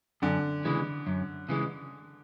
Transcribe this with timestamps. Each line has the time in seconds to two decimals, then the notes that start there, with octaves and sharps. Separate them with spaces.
0.22 F#2 D3
0.65 C#3 E3 G#3
1.07 F#2
1.49 C#3 E3 G#3